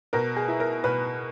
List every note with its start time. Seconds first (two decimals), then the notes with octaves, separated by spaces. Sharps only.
0.13 B2 A#4
0.36 G#4
0.48 E4
0.60 A#4
0.84 B2 B4